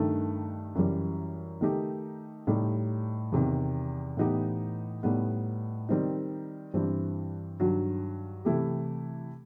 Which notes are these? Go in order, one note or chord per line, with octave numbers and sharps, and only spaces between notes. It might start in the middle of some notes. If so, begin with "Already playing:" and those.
Already playing: G2 D#3 A3 D#4
F#2 E3 G3
D#3 A3 D#4 G4
A2 G3 D#4 G4
E2 C3 D#3
A2 E3 B3 D#4 G4
A2 G3 B3 D#4
D#3 G3 C4 D#4
G2 E3 G3 C4
G2 D#3 F#3
C3 E3 A3 E4 G4